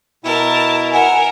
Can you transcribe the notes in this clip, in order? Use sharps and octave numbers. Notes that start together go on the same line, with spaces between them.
B2 E4 A#4 A5
A#4 E5 F#5 G#5